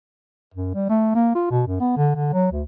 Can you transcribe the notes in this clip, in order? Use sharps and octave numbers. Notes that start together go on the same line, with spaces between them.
F#2
G3
A3
A#3
F4
B2
F#2
B3
D3
D3
F#3
D2